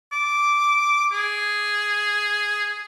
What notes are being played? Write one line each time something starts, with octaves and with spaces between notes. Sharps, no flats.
D6
G#4